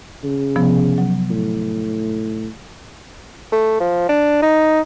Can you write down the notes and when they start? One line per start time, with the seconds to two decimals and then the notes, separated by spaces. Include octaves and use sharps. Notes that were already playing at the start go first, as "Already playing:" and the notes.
0.24 C#3
0.56 C3 F3 B3
0.98 F#3
1.30 A2
3.52 A3
3.80 F3
4.09 D4
4.42 D#4